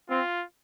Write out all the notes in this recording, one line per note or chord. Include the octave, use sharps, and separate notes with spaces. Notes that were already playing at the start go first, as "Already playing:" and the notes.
C4 F4